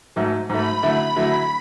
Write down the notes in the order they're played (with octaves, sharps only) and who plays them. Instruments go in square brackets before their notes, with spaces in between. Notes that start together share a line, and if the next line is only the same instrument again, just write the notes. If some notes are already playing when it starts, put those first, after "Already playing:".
[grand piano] G#2 F#3 A3
[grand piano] G#2 F#3 A3 [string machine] B5
[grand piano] D3 F#3 A3 E4
D3 F#3 A3 E4